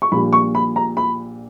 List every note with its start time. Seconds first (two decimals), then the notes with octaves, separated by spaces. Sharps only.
0.02 C#6
0.12 A#1 A#2 G3 B5
0.33 C#6
0.55 B5
0.76 A#5
0.97 B5